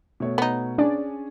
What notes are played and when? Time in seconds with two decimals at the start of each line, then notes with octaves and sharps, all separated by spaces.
0.20 B2 A3 C#5
0.38 B3 D#4
0.78 C#4 D4 G#4 D5